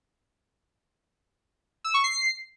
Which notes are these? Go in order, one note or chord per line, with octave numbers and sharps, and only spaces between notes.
E6
C#6
C7